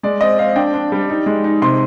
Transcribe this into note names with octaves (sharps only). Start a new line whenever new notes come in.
G#3 D5
C4 D#5
C4 F5
D4 G5
D4
G3
D#4
G#3
D#4
C3 C6